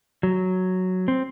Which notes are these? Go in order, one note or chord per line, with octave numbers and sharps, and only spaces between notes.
F#3
C4